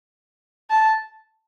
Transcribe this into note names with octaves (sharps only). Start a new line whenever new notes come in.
A5